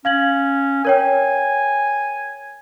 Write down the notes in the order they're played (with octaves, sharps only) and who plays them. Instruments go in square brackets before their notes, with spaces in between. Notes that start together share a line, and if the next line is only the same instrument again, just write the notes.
[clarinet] C#4 [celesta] F5 G#6 F#7
[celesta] A#4 C#5 G5 [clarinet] G#5